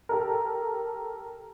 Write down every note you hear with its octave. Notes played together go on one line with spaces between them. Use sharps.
G4 A4 A#4